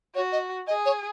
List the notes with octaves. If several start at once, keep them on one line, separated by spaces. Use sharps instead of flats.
F#4 C#5
D#5
G#4 D#5
C#5